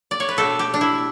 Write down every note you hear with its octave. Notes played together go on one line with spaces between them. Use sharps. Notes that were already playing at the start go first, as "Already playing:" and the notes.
D5
C#5
B4
B2 A3 D4 A4
G4
D4
E4